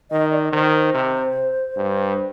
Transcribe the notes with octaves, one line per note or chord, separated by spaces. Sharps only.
D#3 D#5
D5
D#3 C5
C3
G2